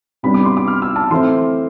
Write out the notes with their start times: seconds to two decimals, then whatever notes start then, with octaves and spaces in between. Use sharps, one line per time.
0.23 C3 G3 B3 D4 B5
0.34 D6
0.45 C6
0.57 D6
0.68 F6
0.82 E6
0.96 A5
1.11 E3 A3 C4 C6